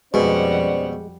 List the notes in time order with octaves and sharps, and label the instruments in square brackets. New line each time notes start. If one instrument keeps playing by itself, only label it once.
[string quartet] F2 G3 F#5 [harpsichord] B2 [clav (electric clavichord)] G#3 [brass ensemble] C#4 C5 D5